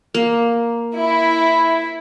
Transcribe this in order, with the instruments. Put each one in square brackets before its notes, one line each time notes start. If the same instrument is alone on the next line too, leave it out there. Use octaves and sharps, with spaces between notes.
[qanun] A#3
[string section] E4